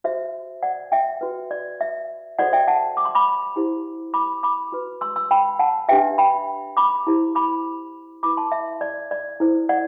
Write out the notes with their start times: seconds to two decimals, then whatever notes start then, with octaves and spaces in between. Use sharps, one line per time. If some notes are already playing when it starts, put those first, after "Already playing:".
0.04 F#4 C5 E5
0.63 D5 F#5
0.92 E5 G5
1.21 F#4 B4
1.51 D5
1.81 E5
2.39 F#4 A4 C5 D5 F#5
2.53 E5 G5
2.68 F#5 A5
2.97 D6
3.05 C6
3.15 B5 D6
3.56 E4 G4 C5
4.14 B5 D6
4.43 B5 D6
4.72 F#4 B4
5.01 C6 E6
5.16 C6 E6
5.31 G5 B5
5.59 F#5 A5
5.89 D4 G4 B4 E5 G5
6.18 G5 B5
6.77 B5 D6
7.07 E4 G4 C5
7.35 B5 D6
8.23 E4 B4 B5 D6
8.37 A5 C6
8.52 E5
8.81 D5
9.11 D5
9.40 E4 A4 C5
9.69 D5 F#5